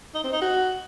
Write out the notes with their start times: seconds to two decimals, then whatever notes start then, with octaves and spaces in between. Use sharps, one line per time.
0.14 D#4
0.23 C4
0.32 D#4
0.41 F#4